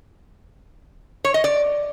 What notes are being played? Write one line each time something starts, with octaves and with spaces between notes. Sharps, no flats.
C#5
D#5
D5